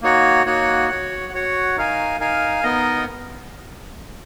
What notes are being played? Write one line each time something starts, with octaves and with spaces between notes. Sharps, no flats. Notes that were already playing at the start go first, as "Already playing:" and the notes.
A#3 D#4 F#4 C#5 F#5
A#3 D#4 F#4 C#5 F#5
F#4 C#5 F#5
F#4 C#5 F#5
D#4 A#4 F5 G#5
D#4 A#4 F5 G#5
B3 D#4 A#4 D#5